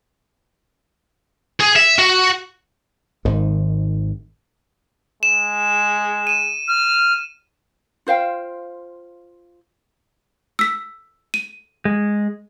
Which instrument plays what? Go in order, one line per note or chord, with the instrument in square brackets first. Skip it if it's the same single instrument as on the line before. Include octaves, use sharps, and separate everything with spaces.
[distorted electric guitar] G#4
E5
F#4
[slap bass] G#1 G#2 D#3
[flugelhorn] G#3 [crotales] E7
[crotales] D#7 E7
[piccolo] F6
[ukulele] F4 C5 F5 G5
[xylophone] E6 B6
D#7
[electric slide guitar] G#3